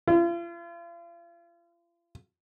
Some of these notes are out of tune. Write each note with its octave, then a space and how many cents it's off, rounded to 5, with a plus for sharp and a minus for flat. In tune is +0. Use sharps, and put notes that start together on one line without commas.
F4 -40